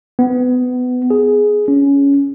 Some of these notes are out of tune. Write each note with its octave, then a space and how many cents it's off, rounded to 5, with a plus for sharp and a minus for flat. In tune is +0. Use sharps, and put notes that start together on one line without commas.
B3 +20
G#4 +10
C#4 +10